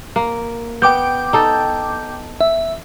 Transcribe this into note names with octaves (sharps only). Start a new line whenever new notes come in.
A#3
B3 G5 D6 G6
D#4 A4
E5